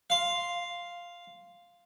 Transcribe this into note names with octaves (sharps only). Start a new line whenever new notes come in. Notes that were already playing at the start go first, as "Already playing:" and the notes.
F5 C6